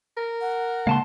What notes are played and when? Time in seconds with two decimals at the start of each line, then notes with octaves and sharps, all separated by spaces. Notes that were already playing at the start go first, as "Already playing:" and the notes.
0.17 A#4
0.41 F#5
0.87 C#3 G#3 A#3 F5 A5 C6